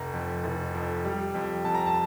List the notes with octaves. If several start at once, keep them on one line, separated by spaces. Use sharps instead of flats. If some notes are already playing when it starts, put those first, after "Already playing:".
Already playing: F1 A#5
F2
F1
F2
G3
F2
F2 A5
A#5
A5